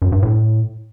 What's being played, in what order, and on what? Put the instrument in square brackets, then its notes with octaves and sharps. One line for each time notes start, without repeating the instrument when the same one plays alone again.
[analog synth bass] F#2
G2
A2